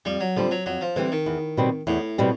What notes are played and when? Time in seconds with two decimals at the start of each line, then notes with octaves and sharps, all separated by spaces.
0.05 F2 G3
0.20 F#3
0.36 D3 F3 G3 C4
0.51 F#3
0.66 F2 F#3
0.81 F3
0.96 D3 E3 G3 C4
1.12 D#3
1.26 E2
1.57 B2 G3 C4
1.87 E2 A2
2.18 B2 G3 C4